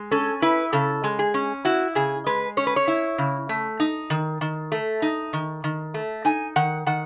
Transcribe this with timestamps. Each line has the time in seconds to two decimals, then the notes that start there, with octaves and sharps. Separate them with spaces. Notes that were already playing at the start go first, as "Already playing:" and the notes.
Already playing: G#3
0.11 C#4 A4
0.42 E4 B4
0.73 C#3 A4
1.04 G#3
1.19 G#4
1.34 C#4
1.65 E4 F#4
1.95 C#3 G#4
2.26 G#3 B4
2.57 C#4 C#5
2.67 B4
2.76 C#5
2.88 E4
3.18 C#3
3.49 A3
3.80 D#4
4.10 D#3
4.41 D#3
4.72 A3
5.02 D#4
5.33 D#3
5.64 D#3
5.94 A3
6.25 D#4 G#5
6.56 D#3 F#5
6.86 D#3 F#5